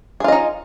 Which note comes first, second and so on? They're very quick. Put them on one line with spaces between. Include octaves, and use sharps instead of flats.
G#4 F4 D#5 D#4